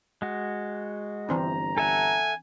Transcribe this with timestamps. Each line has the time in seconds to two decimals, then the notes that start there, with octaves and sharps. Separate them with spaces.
0.22 G#3 F#4
1.29 G1 E3 C4 D4 A#5
1.78 A4 E5 F#5 G#5